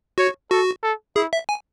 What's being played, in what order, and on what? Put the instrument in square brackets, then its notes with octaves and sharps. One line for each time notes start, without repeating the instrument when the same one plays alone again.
[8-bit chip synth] F#4 [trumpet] C#5
[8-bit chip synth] F#4 [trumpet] A4
[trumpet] A4
[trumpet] E4 [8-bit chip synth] G#4
[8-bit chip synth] E5
G#5